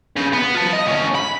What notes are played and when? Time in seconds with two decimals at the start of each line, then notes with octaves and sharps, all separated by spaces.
0.17 C#3
0.34 B3
0.55 F4 A5
0.73 D#5
0.86 D2 C#4
1.15 B5